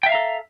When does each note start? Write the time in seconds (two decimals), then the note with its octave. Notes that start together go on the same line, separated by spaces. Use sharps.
0.03 G5
0.06 E5
0.09 F5
0.12 A#5
0.15 A4